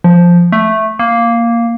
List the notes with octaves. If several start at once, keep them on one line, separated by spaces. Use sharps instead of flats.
F3
A3
A#3